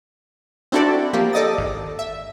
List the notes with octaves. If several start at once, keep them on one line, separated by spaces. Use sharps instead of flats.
C4 D4 E4 F#4 A4 D5
F3 A#3 G4
A4 D5 D#5 D#6 A6
G#1
E5